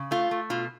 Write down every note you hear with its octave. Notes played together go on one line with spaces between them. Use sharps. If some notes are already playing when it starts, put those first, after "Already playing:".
Already playing: C#3
A3 F4
A3
B2 F4